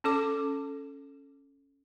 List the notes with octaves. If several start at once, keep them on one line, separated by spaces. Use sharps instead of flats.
C#4 A4 D6